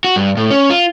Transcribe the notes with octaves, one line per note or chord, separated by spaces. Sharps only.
F#4
G2
A2
C#4
F4